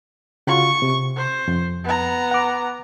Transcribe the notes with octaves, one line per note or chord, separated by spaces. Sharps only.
C#3 F4 F#4 C#6
C3
C5
F2
B3 A#5
F#5 D6